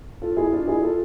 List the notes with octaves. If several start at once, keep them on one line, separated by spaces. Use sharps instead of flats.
F4 A4
E4 G#4
D4 F4
E4 G#4
F4 A4